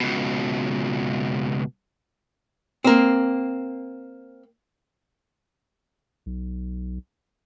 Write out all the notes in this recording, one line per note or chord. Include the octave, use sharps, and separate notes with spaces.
C#2 B2
A#3 C4
B1